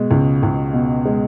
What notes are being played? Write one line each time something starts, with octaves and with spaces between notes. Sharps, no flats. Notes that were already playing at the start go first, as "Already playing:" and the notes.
Already playing: B2 G#3
C#2
C#2
B2
G#3